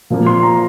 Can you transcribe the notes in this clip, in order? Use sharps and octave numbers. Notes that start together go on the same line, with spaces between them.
A#2 F3 A#3
C6
A#5